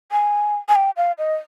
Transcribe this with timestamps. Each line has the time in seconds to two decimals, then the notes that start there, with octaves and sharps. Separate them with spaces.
0.12 G#5
0.69 G#5
0.76 G5
0.97 F5
1.18 D#5